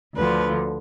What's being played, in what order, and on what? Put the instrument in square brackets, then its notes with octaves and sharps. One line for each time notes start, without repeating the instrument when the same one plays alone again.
[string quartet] D2 D3 F3 B4